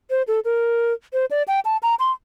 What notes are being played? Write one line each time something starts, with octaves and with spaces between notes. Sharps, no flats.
C5
A4
A#4
C5
D5
G5
A5
A#5
C6